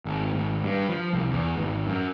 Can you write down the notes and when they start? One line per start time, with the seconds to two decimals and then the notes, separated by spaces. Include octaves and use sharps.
0.05 G#1
0.34 G#1
0.64 G2
0.89 F3
1.13 C2
1.31 E2
1.56 G#1
1.87 F#2